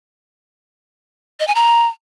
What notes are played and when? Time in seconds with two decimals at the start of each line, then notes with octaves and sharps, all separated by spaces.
1.40 D#5
1.47 G#5
1.55 A#5